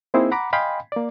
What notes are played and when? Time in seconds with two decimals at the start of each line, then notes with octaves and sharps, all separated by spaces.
0.14 A#3 C4 D#4 E4 G#4 C5
0.31 F#5 A#5 B5 D6
0.53 D#5 F5 G5 G#5 B5 C6
0.92 A#3 D5